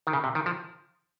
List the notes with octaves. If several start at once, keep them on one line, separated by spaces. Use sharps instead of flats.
D#3
C#3
C3
D#3
F3